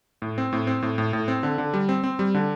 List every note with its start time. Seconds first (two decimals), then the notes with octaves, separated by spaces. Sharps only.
0.22 A2
0.38 C4
0.53 A2
0.67 C4
0.82 A2
0.98 A2
1.13 A2
1.28 C4
1.43 D3
1.58 D3
1.74 G3
1.89 C4
2.04 C4
2.19 G3
2.34 D3